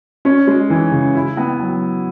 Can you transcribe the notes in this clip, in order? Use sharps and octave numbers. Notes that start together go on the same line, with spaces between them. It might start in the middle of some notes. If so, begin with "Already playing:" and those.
C#4
G#3
E3
C#3
E4
B3
F#3